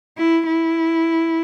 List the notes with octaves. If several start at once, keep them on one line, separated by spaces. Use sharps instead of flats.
E4
E4